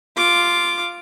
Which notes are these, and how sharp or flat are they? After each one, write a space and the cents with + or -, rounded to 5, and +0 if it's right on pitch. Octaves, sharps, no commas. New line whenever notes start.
F4 -5 D6 +0